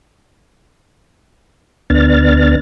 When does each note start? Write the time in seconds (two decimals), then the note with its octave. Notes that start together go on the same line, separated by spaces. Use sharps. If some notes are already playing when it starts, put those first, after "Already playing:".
1.90 D2 B3 D4 F6 A6